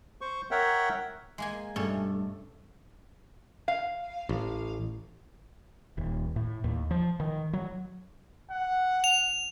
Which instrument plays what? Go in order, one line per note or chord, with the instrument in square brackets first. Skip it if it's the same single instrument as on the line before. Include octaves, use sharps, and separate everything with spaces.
[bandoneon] C5 C#6
A#4 C#5 E5 F#5 G5
[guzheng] G#3 A#3 G#5
[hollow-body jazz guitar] G2 [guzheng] B2 C#4 A4 [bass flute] A3
[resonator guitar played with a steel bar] F5
[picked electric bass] A1
[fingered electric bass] D#1
A2
D#2
F3
D#3
F#3
[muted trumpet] F#5
[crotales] F7